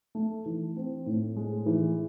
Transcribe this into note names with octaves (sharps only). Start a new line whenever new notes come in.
A3
E3
C4
A2
G#3
E3